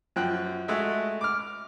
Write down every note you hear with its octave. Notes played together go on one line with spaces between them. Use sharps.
F#2 F3 G5 F#6
G#3 A3 F#4 E5
D6 F6